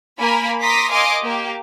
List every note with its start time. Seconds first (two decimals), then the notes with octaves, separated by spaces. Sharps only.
0.20 A#3 A#4 G#5 B5
0.61 A#5 C6 D6 D#6 A#6 B6
0.91 A#4 D#5 F5 G#5 C6 D6
1.21 A#3 G4